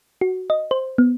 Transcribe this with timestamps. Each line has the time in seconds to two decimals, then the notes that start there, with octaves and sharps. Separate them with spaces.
0.21 F#4
0.50 D#5
0.71 C5
0.98 B3